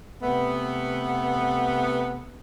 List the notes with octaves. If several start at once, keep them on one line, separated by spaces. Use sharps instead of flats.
C3 A3 B3